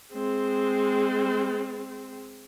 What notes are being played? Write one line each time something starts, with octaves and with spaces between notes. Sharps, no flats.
G#3 C4